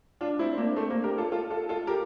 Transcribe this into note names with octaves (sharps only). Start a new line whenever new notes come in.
D4 F4
C4 E4
C4
A#3 D4
A3 C4
A#3 D4
G4 A#4
F4 A4
F4 A4
F4 A4
F4 A4
G4 A#4